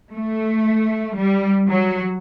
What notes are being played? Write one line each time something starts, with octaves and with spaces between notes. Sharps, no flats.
A3
G3
F#3